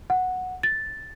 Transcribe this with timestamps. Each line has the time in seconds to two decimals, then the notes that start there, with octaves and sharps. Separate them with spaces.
0.10 F#5
0.63 A6